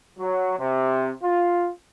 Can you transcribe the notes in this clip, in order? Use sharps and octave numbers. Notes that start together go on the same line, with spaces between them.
F#3
C3
F4